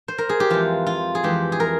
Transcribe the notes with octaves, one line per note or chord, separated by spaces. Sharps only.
C5
A#4
G#4
G4
F2 E3 G#3 F4
F4
G#4
F2 E3 G#3 G4
G#4
A#4